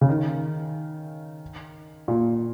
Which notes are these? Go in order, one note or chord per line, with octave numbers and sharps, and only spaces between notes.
C#3
D#3
A#2